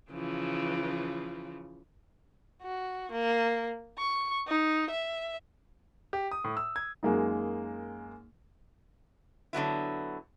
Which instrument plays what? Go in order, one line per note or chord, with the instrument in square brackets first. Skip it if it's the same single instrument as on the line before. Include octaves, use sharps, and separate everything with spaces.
[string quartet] C#3 E3 F3
[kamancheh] F#4
A#3
C#6
D#4
E5
[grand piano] G4
D#6
A2
E6
G#6
[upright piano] F#2 G#3 A#3 D#4
[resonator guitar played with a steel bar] D3 F#3 B3 E4